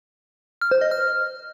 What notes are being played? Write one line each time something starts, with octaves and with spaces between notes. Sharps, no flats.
F6
C5
D#5
F6